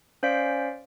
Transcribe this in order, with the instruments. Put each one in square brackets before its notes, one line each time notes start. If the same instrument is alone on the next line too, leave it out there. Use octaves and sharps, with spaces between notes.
[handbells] C#4 C5 D5 F5 B6 D7